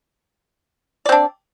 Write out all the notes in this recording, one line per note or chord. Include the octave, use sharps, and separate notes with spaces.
C4 D4 D5